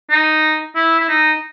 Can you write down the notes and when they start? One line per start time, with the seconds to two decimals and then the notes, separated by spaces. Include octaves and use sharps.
0.10 D#4
0.75 E4
0.99 E4
1.09 D#4